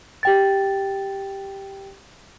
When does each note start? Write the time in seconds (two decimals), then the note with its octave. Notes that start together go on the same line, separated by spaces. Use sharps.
0.23 G4 G5 A6